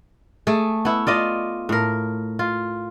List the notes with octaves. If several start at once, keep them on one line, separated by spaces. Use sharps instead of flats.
A3 G#4
B3 E4
F4 D5 D#5
A2 A#4
F4